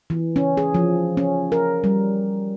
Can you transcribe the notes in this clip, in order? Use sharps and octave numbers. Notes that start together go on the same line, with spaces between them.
E3
C#4
G#4
F3
C#4
A#4
G3